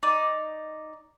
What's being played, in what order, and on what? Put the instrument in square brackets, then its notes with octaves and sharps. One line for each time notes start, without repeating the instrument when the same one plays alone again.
[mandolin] D#4 D5